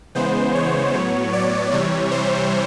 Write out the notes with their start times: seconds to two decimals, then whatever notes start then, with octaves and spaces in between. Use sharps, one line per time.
0.15 C#3 E3 G#3 B3 C5
0.55 C#5
0.94 A2 F#3 B3
1.33 D5
1.72 C3 E3 G3 C#5
2.11 C5